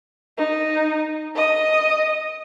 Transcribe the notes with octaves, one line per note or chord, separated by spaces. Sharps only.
D#4
D#5 D#6